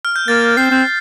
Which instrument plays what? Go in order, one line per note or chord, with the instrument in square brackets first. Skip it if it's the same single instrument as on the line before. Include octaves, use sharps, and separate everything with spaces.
[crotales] F6
G6
[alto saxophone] A#3 [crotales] A6
[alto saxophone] C4 [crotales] C7
[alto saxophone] C4